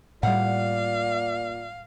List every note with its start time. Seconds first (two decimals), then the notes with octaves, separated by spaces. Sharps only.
0.23 A2 G3 A#3 F4 D5 F5 F#5